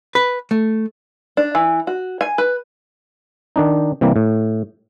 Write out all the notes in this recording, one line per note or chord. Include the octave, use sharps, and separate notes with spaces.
B4
A3
D4
E3
F#4
G#5
B4
D#3 D4 D#4
C3 E3 G3 A#3
A2